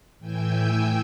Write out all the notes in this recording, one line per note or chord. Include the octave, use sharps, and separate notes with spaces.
A2 E3 G5 G#5 E6 G6